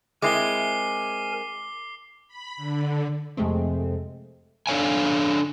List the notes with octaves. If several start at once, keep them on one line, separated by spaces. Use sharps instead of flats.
G#3 C4 E4 A#4 G#5 D6 C7 G7
B5
D3
F2 C3 G#3 A3 C4
D4 A4 C5 C#5 F5 G#5